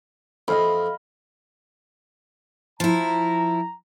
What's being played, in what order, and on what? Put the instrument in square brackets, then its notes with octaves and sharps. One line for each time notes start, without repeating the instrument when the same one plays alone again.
[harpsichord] F2 [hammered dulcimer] D#5 F5 B5
[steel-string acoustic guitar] F3 E4 [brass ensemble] A#5